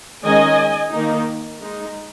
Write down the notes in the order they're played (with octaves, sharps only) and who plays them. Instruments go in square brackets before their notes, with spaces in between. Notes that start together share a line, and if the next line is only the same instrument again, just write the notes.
[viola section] D#3 G#3 C#4 D#5 G#5
D#3 A#3 D#4
G#3 D#4